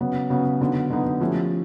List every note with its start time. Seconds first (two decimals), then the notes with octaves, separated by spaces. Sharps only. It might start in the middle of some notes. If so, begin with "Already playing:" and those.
0.01 C#3 F#3 B3
0.30 C#3 F#3 B3
0.61 D3 F#3 B3 D#4
0.90 D3 F#3 B3 D#4
1.20 F3 A3 C#4 E4 G4